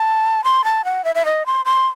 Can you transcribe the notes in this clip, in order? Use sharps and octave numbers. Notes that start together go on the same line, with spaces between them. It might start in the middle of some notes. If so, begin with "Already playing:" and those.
Already playing: A5
C6
A5
F#5
E5
E5
D#5
C6
C6